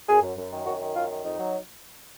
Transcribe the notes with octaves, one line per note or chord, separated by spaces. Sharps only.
F#2 G#4
F#2
F#2
D#3
F#2 F#4
D#3
F#2 F4
D#3
F2 D#4
F#3